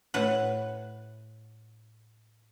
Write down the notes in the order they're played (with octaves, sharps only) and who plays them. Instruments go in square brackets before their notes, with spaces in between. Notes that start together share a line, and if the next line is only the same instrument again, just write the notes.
[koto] A2 B4 F#5